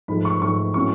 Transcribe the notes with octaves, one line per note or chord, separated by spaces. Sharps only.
G#2 F3 A3 B5
C#6
G#2 F3 A3 C#6
A2 F#3 C#4 C#6